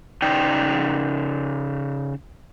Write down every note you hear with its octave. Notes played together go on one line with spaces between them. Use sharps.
C#3 D#4 D5 G5